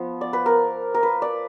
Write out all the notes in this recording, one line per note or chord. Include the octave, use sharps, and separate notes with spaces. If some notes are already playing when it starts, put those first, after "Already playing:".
Already playing: F3 B3
D5
B4
A#4
A#4
B4
D5